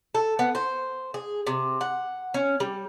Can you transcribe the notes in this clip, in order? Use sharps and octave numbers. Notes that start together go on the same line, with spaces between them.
A4
B3
C5
G#4
C3
F#5
C#4
G3